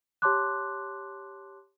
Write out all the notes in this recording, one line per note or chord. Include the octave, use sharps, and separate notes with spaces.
G4 C#5 A5 C6 D6 F#6